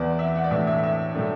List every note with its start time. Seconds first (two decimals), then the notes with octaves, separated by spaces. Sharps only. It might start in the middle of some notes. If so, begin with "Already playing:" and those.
Already playing: E2 E3 B3 D5
0.19 E5
0.36 F#5
0.44 D5
0.51 A2 E3 A3 D4 E5
0.67 E5
0.84 E5
1.14 A2 F#3 A3 D4